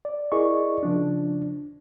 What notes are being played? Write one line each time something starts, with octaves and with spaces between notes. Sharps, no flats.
D5
E4 G#4 A#4 D5 D#5 C#6
C#3 F3 D4